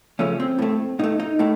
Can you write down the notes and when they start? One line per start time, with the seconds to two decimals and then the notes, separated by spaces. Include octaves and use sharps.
0.19 C#2 C#3 F3 A3 C#4
0.40 C4
0.59 A2 A3
0.99 A2 A3 D#4
1.20 D#4
1.39 A2 A3